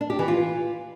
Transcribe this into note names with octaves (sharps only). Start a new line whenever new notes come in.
D4
G4
E3
F4